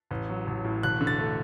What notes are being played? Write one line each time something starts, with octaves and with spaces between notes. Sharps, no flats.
A1
F#3
A1
A2
E1 F#6
D3
A6
A3